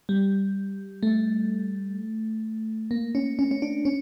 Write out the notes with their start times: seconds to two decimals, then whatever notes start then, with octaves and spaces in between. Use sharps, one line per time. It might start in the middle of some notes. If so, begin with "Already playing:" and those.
0.09 G3
1.03 A3
2.91 A#3
3.15 C#4
3.39 C#4
3.51 C#4
3.62 D4
3.85 C#4